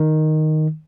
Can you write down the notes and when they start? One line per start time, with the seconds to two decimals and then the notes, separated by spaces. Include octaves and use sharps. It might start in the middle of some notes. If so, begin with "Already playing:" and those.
Already playing: D#3